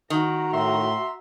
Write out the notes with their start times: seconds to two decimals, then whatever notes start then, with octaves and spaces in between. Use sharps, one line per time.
0.10 D#3 F#4 A#5
0.53 A2 E5 C6